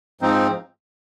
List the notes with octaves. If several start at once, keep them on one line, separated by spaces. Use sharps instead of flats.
G#2 F3 C4 D#4